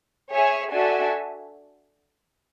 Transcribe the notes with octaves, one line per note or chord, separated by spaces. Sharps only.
G#4 C#5 E5 G#5
D4 F#4 A4 E5 G#5